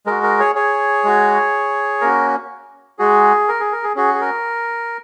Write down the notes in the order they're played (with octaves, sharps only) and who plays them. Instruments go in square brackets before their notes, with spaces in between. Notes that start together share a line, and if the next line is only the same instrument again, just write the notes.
[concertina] G#3 F#4 A#4
A#4
G#4 C#5
G#4 C#5
G#3 F#4
A#3 C#4 F#4 A#4
G#3 F#4 G#4
A#4
G#4
A#4
G#4
C#4 F#4 G#4
G#4
A#4